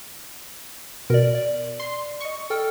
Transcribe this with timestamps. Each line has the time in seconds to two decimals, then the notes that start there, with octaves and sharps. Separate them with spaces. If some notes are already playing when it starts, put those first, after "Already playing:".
1.10 B2 A#4 D5
1.35 D5
1.80 C6
2.20 D#5 C#6
2.50 A4 G5 F6